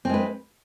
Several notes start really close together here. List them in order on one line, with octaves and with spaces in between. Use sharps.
C4 G#3 B4